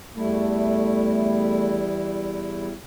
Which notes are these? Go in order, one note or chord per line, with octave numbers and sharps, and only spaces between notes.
E2 G3 A3 E4